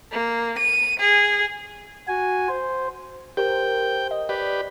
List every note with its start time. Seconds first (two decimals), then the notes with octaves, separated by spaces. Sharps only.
0.12 A#3
0.59 D#7
1.00 G#4
2.08 F#4 G#5
2.49 C5
3.37 G4 A#4 C5 G5
4.11 D#5
4.29 G4 B4 D5